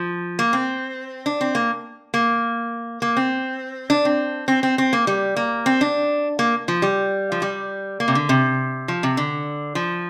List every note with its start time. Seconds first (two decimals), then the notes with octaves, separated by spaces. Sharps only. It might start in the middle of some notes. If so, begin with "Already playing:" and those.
Already playing: F3
0.39 A#3
0.53 C4
1.26 D4
1.41 C4
1.55 A#3
2.14 A#3
3.02 A#3
3.17 C4
3.90 D4
4.05 C4
4.48 C4
4.63 C4
4.78 C4
4.93 A#3
5.07 G3
5.37 A#3
5.66 C4
5.81 D4
6.39 A#3
6.68 F3
6.82 G3
7.32 F3
7.42 G3
8.00 A#3
8.08 C3
8.15 D3
8.29 C3
8.88 F3
9.03 C3
9.17 D3
9.75 F3